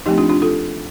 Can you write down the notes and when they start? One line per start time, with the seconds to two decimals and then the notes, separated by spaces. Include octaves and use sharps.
0.06 F3 A3 C4 D#4 G4
0.18 D4 F4
0.29 D4 F4
0.42 F4 A4